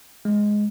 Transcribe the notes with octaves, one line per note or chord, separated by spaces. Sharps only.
G#3